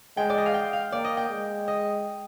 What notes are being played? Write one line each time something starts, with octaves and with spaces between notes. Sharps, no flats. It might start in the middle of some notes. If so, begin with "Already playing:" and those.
G#3 G5
D5
D#5
F5
G5
F5
A#3 D5
D#5
G5
G#3
D#5